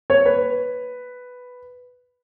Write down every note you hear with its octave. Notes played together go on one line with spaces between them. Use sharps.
C#5
B4